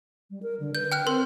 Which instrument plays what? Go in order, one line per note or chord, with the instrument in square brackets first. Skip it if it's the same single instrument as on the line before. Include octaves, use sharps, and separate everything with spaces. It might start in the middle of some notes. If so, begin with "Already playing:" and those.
[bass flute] G3
A#4
D3
[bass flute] B4 [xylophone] G6
[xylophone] G5 F6 F#6
[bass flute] C4 [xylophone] A#4 C6